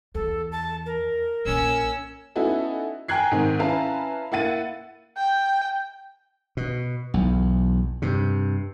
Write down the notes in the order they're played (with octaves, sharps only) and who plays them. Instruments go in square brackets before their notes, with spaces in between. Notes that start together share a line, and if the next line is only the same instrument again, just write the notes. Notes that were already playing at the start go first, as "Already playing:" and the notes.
[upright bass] E2 [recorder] A4
[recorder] A5
A#4
[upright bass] A#1 A#2 [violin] C#4 E6
[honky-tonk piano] B3 C#4 D#4 E4 F#4 A4
G5 G#5 A#5 F#6 G#6 C7
G#2 D#3 C4
C#4 E4 B4 F5 A5 A#5
A#3 E4 F#5 A6 D#7
[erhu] G5
[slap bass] B2
B1 E2
G2 C3